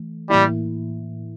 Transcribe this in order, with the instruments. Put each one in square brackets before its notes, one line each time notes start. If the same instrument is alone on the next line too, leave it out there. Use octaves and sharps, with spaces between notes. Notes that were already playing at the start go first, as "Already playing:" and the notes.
Already playing: [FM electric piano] E3 A3
[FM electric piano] A2 E3 A#3 E4 [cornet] G3